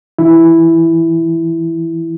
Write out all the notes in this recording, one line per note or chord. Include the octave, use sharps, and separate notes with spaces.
E3 E4